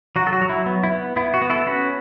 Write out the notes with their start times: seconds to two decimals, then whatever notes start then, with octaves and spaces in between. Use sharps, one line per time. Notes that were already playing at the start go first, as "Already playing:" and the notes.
0.16 F#3 F#4
0.27 A4
0.33 F#4
0.41 F#3
0.49 E4
0.66 B3
0.84 E4
0.91 B3
1.16 B3 E4
1.34 F#4
1.42 B3
1.50 E4 A4
1.67 C#4 F#4 B4